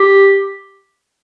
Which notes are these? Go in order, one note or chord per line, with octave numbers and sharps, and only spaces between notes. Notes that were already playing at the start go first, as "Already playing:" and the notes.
Already playing: G4